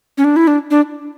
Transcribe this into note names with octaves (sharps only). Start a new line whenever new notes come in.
C#4
D4
E4
D4
D4